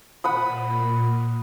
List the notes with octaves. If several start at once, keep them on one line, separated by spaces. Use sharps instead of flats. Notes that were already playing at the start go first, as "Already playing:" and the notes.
A#2 F#5 B5 D#6